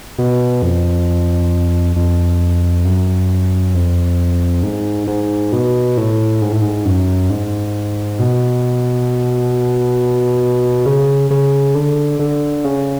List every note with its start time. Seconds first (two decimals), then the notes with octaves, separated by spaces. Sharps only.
0.19 B2
0.62 F2
1.96 F2
2.85 F#2
3.74 F2
4.63 G#2
5.07 G#2
5.52 B2
5.97 A2
6.42 G#2
6.52 A2
6.62 G#2
6.85 F#2
7.30 G#2
8.19 B2
10.86 C#3
11.31 C#3
11.75 D3
12.19 D3
12.64 C#3